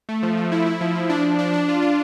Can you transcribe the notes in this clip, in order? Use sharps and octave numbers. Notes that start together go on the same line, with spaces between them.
A3
F3
F3
E4
E4
F3
F3
D4
D4
D4
D4
F4
F4